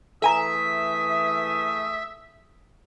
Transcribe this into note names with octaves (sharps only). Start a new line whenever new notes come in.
E3 A3 G#4 A4 E5 G#5 A#5 D#6